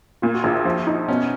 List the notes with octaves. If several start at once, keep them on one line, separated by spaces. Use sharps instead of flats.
A#2 F4
F#4
A#1 F4
F3
D#4
B2 C#4